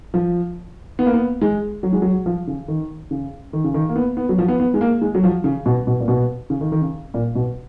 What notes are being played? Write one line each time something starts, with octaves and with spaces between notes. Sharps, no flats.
F3
B3
A#3
B3
G#3
F#3
G#3
F#3
F3
C#3
D#3
C#3
D#3
C#3
D#3
A#3
B3
B3
F#3
F3
B3
B3
G#3
A#3
G#3
F#3
F3
C#3
B2
B2
A#2
B2
C#3
D#3
D#3
C#3
A#2
B2